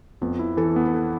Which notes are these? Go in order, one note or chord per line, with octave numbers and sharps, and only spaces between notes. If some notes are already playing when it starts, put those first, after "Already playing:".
F2 B3
E4
E3 A4
B3
B4
A4